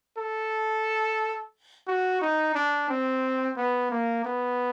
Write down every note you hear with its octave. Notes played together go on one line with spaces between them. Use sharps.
A4
F#4
D#4
D4
C4
B3
A#3
B3